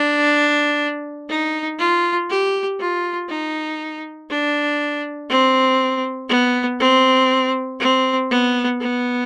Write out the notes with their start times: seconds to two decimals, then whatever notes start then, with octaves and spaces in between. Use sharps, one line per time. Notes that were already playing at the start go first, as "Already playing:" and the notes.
Already playing: D4
1.29 D#4
1.79 F4
2.29 G4
2.80 F4
3.29 D#4
4.30 D4
5.30 C4
6.29 B3
6.80 C4
7.80 C4
8.31 B3
8.80 B3